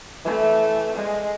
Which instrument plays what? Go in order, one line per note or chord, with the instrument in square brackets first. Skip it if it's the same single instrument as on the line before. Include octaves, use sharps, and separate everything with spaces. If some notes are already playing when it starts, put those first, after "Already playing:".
[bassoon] E3 [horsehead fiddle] A3
[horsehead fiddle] G#3